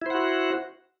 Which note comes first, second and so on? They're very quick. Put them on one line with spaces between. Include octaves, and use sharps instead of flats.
E4 C5 F#5 F#4